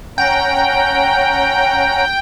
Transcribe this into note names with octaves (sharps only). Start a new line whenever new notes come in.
C#4 F#5 G5 A#5